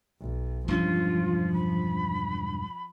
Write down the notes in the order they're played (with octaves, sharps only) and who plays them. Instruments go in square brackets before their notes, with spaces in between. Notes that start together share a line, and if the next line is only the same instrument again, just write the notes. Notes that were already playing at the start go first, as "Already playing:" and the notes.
[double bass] B1
[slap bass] E1 G2 C#4 [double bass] F3 [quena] F4
[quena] B5